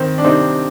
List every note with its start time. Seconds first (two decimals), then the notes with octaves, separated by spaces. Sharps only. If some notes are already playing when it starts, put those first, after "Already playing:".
Already playing: D#3 C4
0.18 D4
0.24 C3 C4 D#4